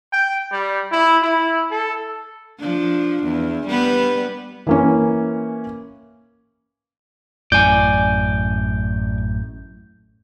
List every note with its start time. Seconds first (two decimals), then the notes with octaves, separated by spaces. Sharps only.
0.13 G5
0.52 G3
0.92 E4
1.23 E4
1.71 A4
2.59 F3 D4
3.23 E2
3.67 G3 B3 B4
4.67 E3 A#3 C#4
7.52 A1 F#2 A2 D5 G#5 G6